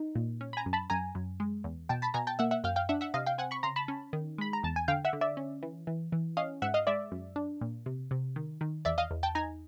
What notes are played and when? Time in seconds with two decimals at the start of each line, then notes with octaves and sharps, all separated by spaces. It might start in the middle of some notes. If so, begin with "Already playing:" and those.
Already playing: D#4
0.15 A#2
0.41 C#4
0.53 B5
0.57 G#5 A#5
0.66 F#2
0.73 A5 B5
0.90 F#2 G#5 A#5
1.15 F#2
1.40 G#3
1.64 E2
1.89 B2 G5 A5
2.02 A5 B5
2.14 B2 G#5 A#5
2.27 G5 A5
2.39 A#3 E5 F#5
2.51 E5 F#5
2.64 F#2 F5 G5
2.76 F5 G5
2.89 D4 E5 F#5
3.01 E5 F#5
3.14 C3 D#5 F5
3.26 F5 G5
3.38 C4 F#5 G#5
3.51 B5 C#6
3.63 C#3 A#5 C6
3.76 A5 B5
3.88 C#4
4.13 D#3
4.38 G#3 B5
4.53 A#5
4.63 E2 A5
4.76 G#5
4.88 D3 F5 G5
5.05 E5 F#5
5.13 D3
5.21 D5 E5
5.37 C#4
5.63 E3
5.87 E3
6.12 E3
6.37 C#4 D#5 F5
6.62 G#2 E5 F#5
6.74 D#5 F5
6.87 G#3 D5 E5
7.12 F#2
7.36 D4
7.61 A#2
7.86 C3
8.11 C3
8.36 D#3
8.61 D#3
8.85 E2 D5 E5
8.98 D#5 F5
9.11 E2
9.23 G5 A5
9.35 D#4 G#5 A#5